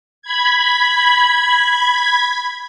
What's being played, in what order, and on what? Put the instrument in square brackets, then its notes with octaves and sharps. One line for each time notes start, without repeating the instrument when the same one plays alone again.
[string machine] B5 G#6